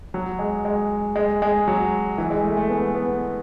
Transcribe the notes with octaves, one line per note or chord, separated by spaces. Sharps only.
F#3
G#3
G#3
G#3
G#3
F#3
E3
G#3
A3
A3
B3
B3